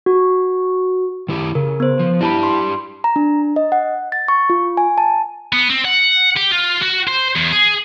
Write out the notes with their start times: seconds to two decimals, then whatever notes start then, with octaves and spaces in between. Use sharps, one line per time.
0.06 F#4
1.29 D#3 E4 G4
1.55 C#3 A#4
1.80 B3 C5
1.99 F3
2.21 D4 E4 G4 A5 B5
2.43 C6
3.04 A#5
3.16 D4
3.56 D#5
3.72 F#5
4.12 A6
4.28 C#6
4.50 F4
4.77 G#5
4.98 A5
5.53 B3
5.70 C4
5.85 F#5
6.36 G4
6.51 F4
6.82 F#4
7.07 C5
7.36 E2
7.52 G#4